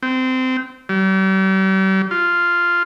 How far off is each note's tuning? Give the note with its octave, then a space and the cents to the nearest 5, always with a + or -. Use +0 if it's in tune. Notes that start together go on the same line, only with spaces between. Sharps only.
C4 -20
G3 -45
F4 -5